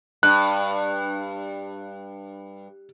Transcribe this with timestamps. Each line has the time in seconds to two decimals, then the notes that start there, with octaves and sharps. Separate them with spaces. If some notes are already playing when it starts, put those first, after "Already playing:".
0.23 G2 F#6